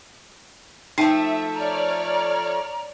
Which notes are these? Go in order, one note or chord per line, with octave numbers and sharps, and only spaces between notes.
F3 A3 D#4 E5 G5
C#5 D5 A#5 F6